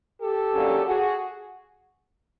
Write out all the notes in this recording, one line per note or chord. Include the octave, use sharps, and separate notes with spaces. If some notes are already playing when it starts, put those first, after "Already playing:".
G4 A4
D#2 D3 F#3 A#3 C#4
F#4 G#4